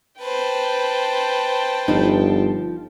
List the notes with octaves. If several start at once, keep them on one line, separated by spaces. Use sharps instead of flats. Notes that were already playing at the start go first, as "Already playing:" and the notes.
B4 C5 G5 A5
G1 F3 D#4